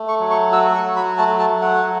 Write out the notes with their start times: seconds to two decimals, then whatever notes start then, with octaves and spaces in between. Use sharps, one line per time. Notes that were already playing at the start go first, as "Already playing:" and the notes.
Already playing: A3
0.08 C#6
0.20 F#3
0.31 C#6
0.52 F#4 E6
0.74 C#6
0.85 F#3
0.96 B5
1.18 A3 A5
1.39 A5
1.50 F#3
1.62 F#5
1.83 F#4